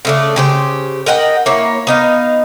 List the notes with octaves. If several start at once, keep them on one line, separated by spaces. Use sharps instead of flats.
C#3 A3 D4
C#3 G4 C5
A#4 D#5 F#5 G5
A#3 E4 C#5
B3 D#4 F5